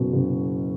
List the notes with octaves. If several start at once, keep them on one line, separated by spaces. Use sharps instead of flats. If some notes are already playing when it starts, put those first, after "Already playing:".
Already playing: F#1 B2 F#3
F#1